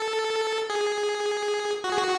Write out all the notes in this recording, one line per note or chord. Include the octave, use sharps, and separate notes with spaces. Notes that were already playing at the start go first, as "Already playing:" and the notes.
Already playing: A4
G#4
F#4
G#4
F#4